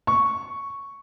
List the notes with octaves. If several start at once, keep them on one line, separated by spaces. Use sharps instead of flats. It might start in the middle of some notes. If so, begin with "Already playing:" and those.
C#6